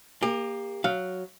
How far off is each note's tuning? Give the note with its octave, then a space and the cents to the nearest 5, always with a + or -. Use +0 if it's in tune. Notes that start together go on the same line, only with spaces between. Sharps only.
A#3 +0 G4 +30
F#3 +0 F5 +0